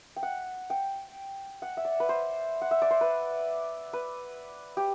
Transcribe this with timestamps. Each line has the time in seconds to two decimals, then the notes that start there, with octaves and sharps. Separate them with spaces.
0.16 G5
0.23 F#5
0.70 G5
1.62 F#5
1.77 E5
1.85 D5
2.00 B4
2.09 C5
2.62 F#5
2.71 E5
2.82 D5
2.91 C5
3.01 B4
3.93 B4
4.77 G4